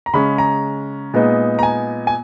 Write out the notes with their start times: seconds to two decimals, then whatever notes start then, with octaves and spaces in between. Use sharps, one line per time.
0.06 A#5
0.14 C#3 G#3 C#4 B5
0.38 A#5
1.14 A#2 G#3 B3 D#4
1.59 A#5
1.63 G#5
2.07 G#5